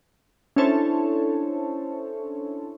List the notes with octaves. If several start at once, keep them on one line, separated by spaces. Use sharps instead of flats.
C#4 D4 E4 A4 C5 C#5